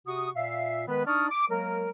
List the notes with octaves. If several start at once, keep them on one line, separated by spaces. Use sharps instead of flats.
C3 F#4 C#6 D#6
A#2 E5 F5
D#3 G#3 B3 B4
D4 D#4 D5 C#6 D#6 F6
D6
F#3 G#3 A#3 A#4